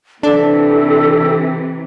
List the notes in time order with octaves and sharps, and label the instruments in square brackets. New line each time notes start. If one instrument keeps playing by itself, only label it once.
[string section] C3 E3 [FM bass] D4 [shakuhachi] A4